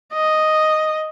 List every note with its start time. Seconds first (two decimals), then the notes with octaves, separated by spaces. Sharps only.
0.13 D#5